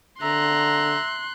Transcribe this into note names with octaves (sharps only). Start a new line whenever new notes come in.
D3 E5 A#5 C6 F#6